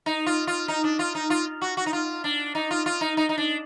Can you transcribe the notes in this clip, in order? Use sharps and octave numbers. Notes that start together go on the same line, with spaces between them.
D#4
F4
F4
D#4
D4
F4
D#4
F4
F#4
F#4
D#4
F4
D4
D#4
F4
F4
D#4
D#4
D#4
D4